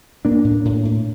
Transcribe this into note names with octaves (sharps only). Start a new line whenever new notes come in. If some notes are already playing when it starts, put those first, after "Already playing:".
A2 A#3 D4
A2
A2
A2